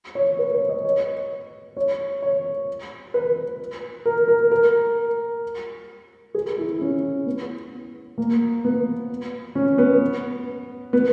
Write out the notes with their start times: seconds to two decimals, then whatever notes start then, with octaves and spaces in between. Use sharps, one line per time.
0.15 C#5
0.39 B4
0.54 C#5
0.69 D#5
0.85 C#5
1.77 C#5
2.22 C#5
3.14 B4
4.06 A#4
4.28 A#4
4.51 A#4
6.35 G#4
6.58 E4
6.81 C#4
7.26 B3
8.18 A#3
8.65 B3
9.55 C#4
9.78 B3
10.93 B3